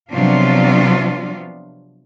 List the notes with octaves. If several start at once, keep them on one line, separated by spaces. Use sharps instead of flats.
C3 F3 F#3 B3 D4 F4